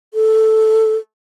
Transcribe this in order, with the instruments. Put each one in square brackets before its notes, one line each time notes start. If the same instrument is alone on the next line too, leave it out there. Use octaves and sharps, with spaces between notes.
[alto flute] A4